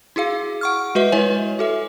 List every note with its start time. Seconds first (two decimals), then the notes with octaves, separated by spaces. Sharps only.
0.16 E4 F#4 G#4 F5
0.61 F#5 C#6 F6
0.95 G#3 F#4 B4 D#5 E5
1.12 G#3 E4 B4 C#5 G#5
1.59 F#4 A4 E5